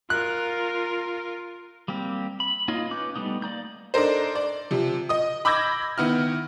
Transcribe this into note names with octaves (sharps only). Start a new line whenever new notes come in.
F4 A#4 F#6
G3 A#3 C4 G4
B5
A#3 D#4 F4 C#5 D#5
C#4 B4 D6 G6
G3 A3 B3 D#4
A#3 D5 A#5 G6
D4 D#4 A4 A#4 C5
D5
C3 F3
D#5 D#6
B5 D6 E6 G6 G#6 A#6
D#3 B3 E4 F6